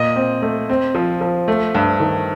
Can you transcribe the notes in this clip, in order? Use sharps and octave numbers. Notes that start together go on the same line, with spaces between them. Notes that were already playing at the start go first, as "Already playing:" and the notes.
Already playing: A#2 D#5
C4
A3
C4
F3
F3
A3
G2
D#3